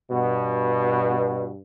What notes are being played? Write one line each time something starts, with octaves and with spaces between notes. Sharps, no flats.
G2 B2